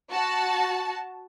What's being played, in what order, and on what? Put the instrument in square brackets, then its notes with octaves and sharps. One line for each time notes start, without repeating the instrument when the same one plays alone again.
[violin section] F#4 A5